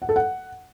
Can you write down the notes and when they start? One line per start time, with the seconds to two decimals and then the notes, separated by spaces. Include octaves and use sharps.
0.02 F#5
0.09 A4
0.16 F#5